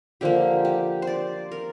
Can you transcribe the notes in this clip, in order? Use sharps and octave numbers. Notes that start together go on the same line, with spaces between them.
D3 F3 A#3 G4
G4
C5
D5
A#4